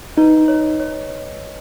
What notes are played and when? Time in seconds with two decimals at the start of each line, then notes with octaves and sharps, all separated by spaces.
0.17 D#4 B4 D#5
0.48 C#5
0.80 C#5